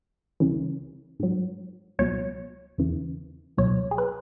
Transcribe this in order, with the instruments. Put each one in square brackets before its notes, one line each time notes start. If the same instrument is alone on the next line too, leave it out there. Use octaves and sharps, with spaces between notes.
[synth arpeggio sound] C#2 C#3 E3
G#2 F#3
C#2 B2 F#3 C#5
E2 C#3 E3
C#2 B2 F#3 C#5
G#4
B4